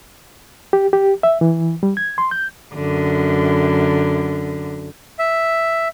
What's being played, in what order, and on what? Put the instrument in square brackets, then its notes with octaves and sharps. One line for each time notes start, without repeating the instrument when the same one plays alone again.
[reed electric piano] G4
G4
E5
E3
G3
G#6
C6
G6
[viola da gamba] F#2 D3
[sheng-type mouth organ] E5